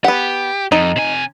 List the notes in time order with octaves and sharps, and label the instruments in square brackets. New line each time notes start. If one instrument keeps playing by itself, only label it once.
[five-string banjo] B3 F#5 [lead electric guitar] G4
[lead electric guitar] F2 [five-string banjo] D#4
[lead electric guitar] C3 G#5